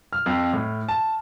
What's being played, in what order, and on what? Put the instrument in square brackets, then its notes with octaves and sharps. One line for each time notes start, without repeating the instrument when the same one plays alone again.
[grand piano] F6
F2
A2
A5